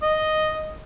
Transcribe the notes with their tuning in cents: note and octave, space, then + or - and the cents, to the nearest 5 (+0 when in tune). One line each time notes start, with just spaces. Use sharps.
D#5 -5